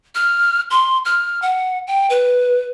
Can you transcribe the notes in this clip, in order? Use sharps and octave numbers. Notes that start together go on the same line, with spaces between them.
F6
C6
F6
F#5
G5
B4